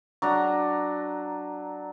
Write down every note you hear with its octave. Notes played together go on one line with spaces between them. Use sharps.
F#3 D4 A#5